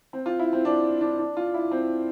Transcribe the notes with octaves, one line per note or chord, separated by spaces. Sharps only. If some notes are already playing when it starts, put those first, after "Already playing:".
C4
F4
E4
C4
D4
D4
D4
F4
E4
C4